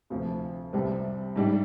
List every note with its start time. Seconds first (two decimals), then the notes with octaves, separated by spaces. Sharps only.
0.10 D2 C3 F3
0.73 C2 C3 G3 C4 G4
1.36 G#2 G3 D4 G4